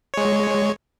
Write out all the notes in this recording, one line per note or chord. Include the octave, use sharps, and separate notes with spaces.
G#3 C#5